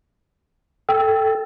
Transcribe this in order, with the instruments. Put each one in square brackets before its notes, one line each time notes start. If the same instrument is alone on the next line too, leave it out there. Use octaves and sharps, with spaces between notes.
[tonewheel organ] A4 [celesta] G5